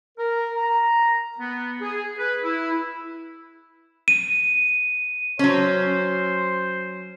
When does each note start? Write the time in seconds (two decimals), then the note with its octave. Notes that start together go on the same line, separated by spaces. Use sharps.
0.18 A#4
0.55 A#5
1.38 B3
1.81 G#4
2.18 B4
2.42 E4
4.08 D#7
5.39 F#3 C#4 C5